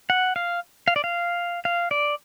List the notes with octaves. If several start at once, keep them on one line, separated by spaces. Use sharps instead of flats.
F#5
F5
F5
D5
F5
F5
D5